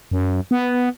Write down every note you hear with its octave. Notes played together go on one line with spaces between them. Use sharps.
F#2
B3